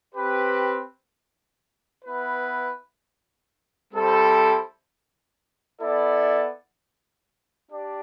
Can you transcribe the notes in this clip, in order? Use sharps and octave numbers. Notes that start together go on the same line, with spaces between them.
C4 G4 B4
B3 E4 B4
G3 C4 E4 A4 C5
B3 E4 A4 D5
D4 G4 D5